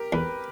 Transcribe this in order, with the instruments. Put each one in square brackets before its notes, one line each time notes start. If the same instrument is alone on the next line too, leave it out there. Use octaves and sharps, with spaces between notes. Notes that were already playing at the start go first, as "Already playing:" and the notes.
Already playing: [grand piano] G4 A#4
[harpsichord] E2 [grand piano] B4